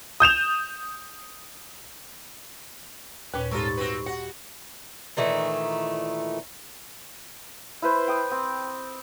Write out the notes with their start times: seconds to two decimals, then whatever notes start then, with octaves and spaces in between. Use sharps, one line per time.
0.20 D#6 G6 E7 F7
3.34 D#2 A#2 C#4 B4
3.51 G#2 G3 F4 A4 A#4 C#6
3.77 C4 F#4 B4
4.06 F#4 F#5
5.17 A#2 D#3 E3 A3
7.82 E4 B4 C5
8.08 G5 D#6
8.31 C4